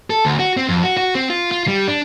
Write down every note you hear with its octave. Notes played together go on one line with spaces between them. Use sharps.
A4
D2
F#4
C4
F2
F#4
F#4
C4
F4
F4
G3
D4